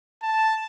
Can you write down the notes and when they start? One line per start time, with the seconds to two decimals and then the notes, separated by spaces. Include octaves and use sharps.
0.22 A5